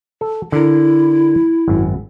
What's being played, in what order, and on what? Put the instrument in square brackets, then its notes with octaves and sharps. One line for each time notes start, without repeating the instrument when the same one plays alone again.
[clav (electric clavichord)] A4
[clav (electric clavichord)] D3 A#4 [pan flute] E4
[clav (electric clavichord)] G#1 F#2